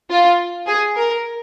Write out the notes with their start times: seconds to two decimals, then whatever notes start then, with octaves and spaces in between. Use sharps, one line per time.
0.10 F4
0.68 G#4
0.96 A#4